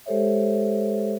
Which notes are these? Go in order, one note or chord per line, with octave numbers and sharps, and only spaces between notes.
G#3 G4 A4 C5 C#5 E5